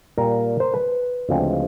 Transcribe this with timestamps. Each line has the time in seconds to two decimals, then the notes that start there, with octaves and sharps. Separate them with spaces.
0.18 A#2 G3 A#3 A#4
0.60 C5
0.74 B4
1.29 D2 C#3 F3 G#3 C4